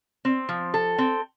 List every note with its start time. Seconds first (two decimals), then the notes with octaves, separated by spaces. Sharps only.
0.25 C4
0.49 F3
0.74 A4
0.98 C4